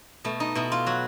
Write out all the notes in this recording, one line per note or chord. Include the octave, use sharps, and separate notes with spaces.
B2 A3
D#4
B2 E4
F4
F#3 F#4